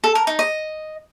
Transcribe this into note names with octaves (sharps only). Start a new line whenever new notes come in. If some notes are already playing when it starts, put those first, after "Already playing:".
A4
A#4
D#4
D#5